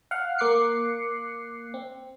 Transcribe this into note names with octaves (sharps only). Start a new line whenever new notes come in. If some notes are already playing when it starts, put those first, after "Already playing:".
F5 F#5 F6
A#3 D6 F#6 C7 C#7
C4